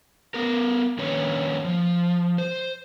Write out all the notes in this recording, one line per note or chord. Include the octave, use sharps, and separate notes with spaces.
B3 A#4
D#3 A#3 C#4 B4 C#5
F3
C5